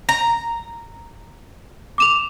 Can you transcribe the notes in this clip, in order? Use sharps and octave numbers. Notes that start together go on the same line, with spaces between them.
A#5 A#6
D6 E7 F7